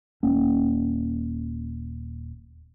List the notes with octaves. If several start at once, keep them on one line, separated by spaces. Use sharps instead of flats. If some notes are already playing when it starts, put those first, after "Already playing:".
D#1 A#3 C#4